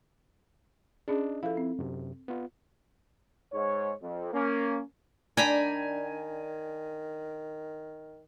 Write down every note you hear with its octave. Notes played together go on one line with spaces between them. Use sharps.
C#4 D4 G#4 D#5
F3 E4 A4 F5
C4
F#2 C3
B3 F4
G#2 C#5
F2
A#3 C#4
D#3 D4 G5 G#5 A#5 B5